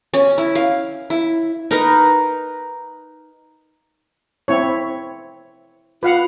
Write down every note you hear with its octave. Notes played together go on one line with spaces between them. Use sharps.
C#4
E4
F5
E4
D#4 A#4 B4
C4 E4 C#5
F4 B4 F5 F#5